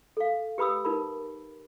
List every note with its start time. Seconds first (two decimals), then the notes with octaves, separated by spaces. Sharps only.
0.17 A4 F5
0.58 G4 B4 B5 D#6 E6
0.85 D#4 A#4 B5